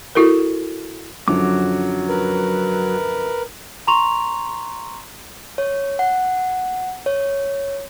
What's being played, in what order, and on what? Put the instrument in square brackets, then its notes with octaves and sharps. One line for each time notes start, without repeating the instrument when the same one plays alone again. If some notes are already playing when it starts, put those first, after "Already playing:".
[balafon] E4 F#4 A4 A#4
[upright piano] F#2 D3 F3 [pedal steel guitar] F#3 D6
[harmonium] A#4 B4
[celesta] A#5 C6 C#6 F7
[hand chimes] C#5
F#5
C#5